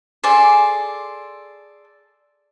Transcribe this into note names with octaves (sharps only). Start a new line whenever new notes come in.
G#4 A4 D5 C6